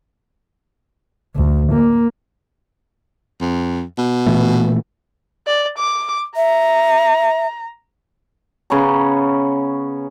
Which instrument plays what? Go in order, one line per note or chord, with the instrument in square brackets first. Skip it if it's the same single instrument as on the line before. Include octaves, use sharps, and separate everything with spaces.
[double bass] D2
A#3
[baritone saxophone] F2
B2
[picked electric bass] A#2 E3 A3
[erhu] D5
D6
[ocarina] E5 [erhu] A#5
[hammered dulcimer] C#3 B3 C#5 A#5